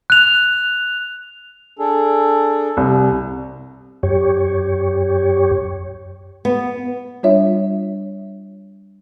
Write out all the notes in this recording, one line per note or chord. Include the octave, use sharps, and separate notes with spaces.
F#6 F7
D4 G#4 A4
C2
F#2 G4 C#5
B3
G3 D4 F4 C#5 E5